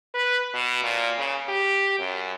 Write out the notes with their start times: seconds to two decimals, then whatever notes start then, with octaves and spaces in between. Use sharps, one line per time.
0.14 B4
0.54 B2
0.83 A#2
1.18 C#3
1.48 G4
1.99 F#2